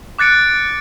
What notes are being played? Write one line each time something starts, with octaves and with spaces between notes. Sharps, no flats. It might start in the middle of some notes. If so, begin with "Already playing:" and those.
D6 F#6 A6 C#7 D7